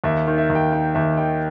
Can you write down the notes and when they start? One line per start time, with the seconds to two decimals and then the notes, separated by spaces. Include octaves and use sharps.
0.04 D#2 E5
0.27 D#3
0.38 E5
0.50 D#2
0.55 G5
0.72 D#3 G5
0.95 D#2 E5
1.17 D#3 G5